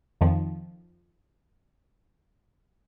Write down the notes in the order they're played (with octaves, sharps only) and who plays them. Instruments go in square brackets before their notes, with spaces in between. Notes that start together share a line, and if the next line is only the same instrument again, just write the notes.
[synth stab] F2 D#3 F3